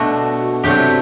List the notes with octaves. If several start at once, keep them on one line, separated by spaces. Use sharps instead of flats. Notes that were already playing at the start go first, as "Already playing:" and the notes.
Already playing: B2 A3 D4 F#4
C3 F#3 A3 D4 G4